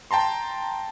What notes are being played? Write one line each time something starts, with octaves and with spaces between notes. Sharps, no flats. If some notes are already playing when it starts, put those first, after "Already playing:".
G5 A5 A#5 C6